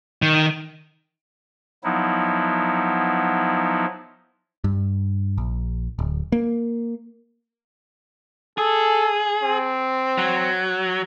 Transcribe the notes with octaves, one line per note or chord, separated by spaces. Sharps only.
D#3
F3 F#3 B3 D#4 E4
G2
A#1
D1
A#3
G#4 A4
C4
F#3